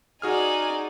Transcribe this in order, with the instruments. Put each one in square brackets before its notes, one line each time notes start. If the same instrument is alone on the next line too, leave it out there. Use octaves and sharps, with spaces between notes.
[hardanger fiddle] D#4 [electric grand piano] F#4 G#4 F6 [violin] D5 G#5